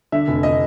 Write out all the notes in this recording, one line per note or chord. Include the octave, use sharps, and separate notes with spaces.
D3 E5
F1
D#5